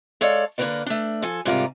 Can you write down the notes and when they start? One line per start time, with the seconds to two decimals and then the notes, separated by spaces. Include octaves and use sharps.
0.21 G#3 A4 C#5 D5 F5
0.58 D3 A#3 C4 A#4 B4 D5
0.86 A3 D4
1.22 F3 A4 G#5
1.45 G#2 C3 G3 F4 F#4 A#4